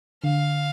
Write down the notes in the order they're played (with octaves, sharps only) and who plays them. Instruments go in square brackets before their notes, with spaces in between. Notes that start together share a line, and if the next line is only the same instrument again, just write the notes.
[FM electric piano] D3 [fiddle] F5